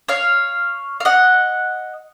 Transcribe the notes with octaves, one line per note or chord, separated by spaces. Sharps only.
C#5 F5
F5
D#5 F#5